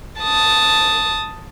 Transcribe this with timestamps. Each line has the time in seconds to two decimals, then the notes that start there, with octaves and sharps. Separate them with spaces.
0.22 A5 D#6